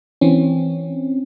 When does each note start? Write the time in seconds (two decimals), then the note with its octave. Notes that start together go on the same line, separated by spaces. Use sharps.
0.21 E3 C4 C#4